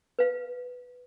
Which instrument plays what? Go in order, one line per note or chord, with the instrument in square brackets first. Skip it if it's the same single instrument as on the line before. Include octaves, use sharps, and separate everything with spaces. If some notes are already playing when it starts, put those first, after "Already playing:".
[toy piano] B4 F5